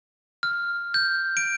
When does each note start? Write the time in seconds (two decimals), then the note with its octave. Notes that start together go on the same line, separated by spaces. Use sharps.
0.43 F6
0.94 G6
1.37 D7